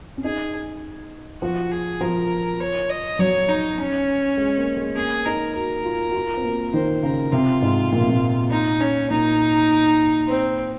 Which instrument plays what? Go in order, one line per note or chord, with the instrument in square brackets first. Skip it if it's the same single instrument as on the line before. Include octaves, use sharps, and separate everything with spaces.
[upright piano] C#4
[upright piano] D#4 [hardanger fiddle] G#4
[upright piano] F3 [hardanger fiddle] F#4
[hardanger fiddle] G#4
[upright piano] F3 [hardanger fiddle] A#4
[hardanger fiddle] C#5
D#5
[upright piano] F#3 [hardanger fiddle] C#5
[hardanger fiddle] D#4
C#4
[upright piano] G#3
A#3
G#3
[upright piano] A#3 [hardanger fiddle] G#4
[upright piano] D#4 [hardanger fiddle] A#4
[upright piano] F#4 [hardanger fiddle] A#4
[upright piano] F4
F#4
F4
C4
A#3
[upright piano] D#3 [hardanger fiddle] C5
[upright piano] C#3 [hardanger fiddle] A#4
[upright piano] C3 [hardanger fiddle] F4
[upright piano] G#2
A#2
C3
A#2
[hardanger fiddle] D#4
C#4
[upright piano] A#2 [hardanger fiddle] D#4
[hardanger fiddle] C4